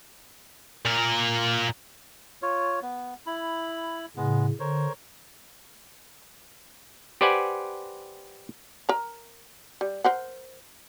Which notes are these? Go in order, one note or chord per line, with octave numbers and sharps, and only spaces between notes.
A#2 A#4
F4 C#5
B3
E4 B5
A2 C#3 G#3 B3
D3 A#4 C5 C#5
G4 B4 C5 D5 F#5 G#5
A#4 A#5
G3
A#4 C5 F#5